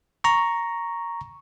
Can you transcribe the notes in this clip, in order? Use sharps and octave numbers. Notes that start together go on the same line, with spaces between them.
A#5 C#6